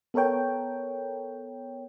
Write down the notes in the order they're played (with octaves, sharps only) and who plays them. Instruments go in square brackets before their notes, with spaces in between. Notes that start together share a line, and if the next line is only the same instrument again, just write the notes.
[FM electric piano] B3 A4 A#4 C#5 G5